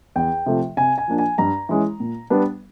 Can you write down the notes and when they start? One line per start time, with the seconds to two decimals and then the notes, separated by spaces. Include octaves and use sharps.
0.16 E2 G5
0.46 C3 F3 A3
0.77 C3 G#5
0.98 G#5
1.08 F3 A#3 D4
1.18 G#5
1.38 G2 A#5
1.69 E3 G#3 C#4
2.00 A#2
2.30 G3 B3 D4